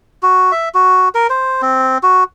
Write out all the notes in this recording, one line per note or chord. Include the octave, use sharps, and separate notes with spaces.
F#4
E5
F#4
A#4
C5
C4
F#4